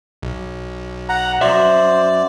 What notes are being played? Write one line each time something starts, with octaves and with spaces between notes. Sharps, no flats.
B1
F#5 A#5
F#2 F#4 C5 D5 E5